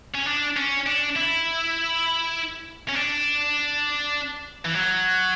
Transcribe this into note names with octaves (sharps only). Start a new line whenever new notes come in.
C#4
D4
C#4
D4
E4
C#4
D4
E3
F#3